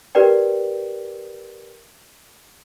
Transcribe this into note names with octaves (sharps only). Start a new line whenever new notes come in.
G4 A#4 B4 D5 G5